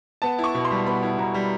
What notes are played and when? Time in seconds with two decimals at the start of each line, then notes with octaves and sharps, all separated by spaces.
0.22 B3 A5
0.39 E4
0.44 C#6
0.55 B2
0.64 C6
0.71 G3
0.86 B3 B5
1.02 E4
1.18 B2 A#5
1.34 G3